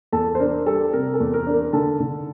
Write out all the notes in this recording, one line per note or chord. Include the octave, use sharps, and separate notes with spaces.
E2 A4 A5
C5
D4 A#4
G3 A4
C3 A#4
A4
E2
A#4
D4
A#4
D3 A4 A5
D3